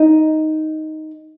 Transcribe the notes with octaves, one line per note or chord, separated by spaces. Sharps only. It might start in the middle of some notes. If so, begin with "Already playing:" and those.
Already playing: D#4